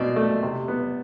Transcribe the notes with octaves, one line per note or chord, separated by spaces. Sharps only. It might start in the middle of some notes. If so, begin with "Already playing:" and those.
Already playing: B2 C4 D5
A3
C3
B3